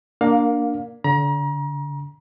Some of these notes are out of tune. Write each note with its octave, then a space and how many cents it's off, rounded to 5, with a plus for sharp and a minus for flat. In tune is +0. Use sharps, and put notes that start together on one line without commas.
A#3 +0 D4 +0 F5 +25
D3 -35 A#5 +35